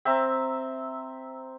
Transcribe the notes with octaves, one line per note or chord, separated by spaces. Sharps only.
C4 E5 A#5